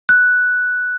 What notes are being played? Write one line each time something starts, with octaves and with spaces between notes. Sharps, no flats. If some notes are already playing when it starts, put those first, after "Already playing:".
F#6